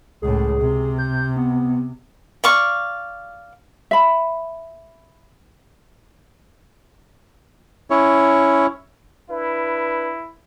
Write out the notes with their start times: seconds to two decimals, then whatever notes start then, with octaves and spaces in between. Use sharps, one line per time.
0.22 C#2 A2 G#4
0.61 C3
0.98 G6
1.36 B3
2.44 D5 F5 C#6
3.91 E5 B5
7.90 C#4 E4 C#5
9.30 D4 E4 B4